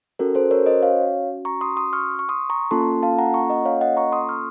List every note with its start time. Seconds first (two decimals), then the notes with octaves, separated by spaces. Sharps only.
0.19 C#4 F#4 A4 A#4
0.35 A4 C5
0.51 A#4 C#5
0.66 C5 D#5
0.82 C#5 F5
1.45 A#5 C#6
1.61 C6 D#6
1.77 C6 D#6
1.93 C#6 F6
2.19 C#6
2.29 C6 D#6
2.50 A#5 C#6
2.71 A#3 C#4 F4 A4 A5 C6
3.03 F5 A5
3.18 F#5 A#5
3.34 A#5 C#6
3.50 D#5 F#5
3.65 C#5 F5
3.81 D#5 F#5
3.97 A#5 C#6
4.12 C6 D#6
4.29 C#6 F6